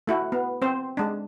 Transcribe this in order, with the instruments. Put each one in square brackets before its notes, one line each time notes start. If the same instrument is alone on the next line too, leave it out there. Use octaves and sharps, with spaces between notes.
[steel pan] A3 E4 F#4
B3
C4 C5
G#3 D4